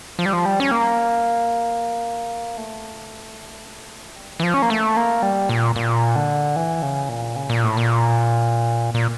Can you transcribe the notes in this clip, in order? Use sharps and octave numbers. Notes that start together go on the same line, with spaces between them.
F3
G3
F3
G3
C#4
A#3
A3
G3
E3
F3
C#4
A#3
A3
A#3
G3
A#2
A#2
D3
E3
C#3
A#2
C#3
A#2
A2
A#2
A#2